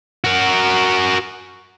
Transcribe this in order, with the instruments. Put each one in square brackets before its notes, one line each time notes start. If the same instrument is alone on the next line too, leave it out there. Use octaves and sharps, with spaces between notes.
[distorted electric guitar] F#4 A#4